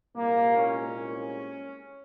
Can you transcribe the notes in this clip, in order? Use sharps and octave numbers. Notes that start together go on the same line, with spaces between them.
C2 A#2 G#3 A#3
C#4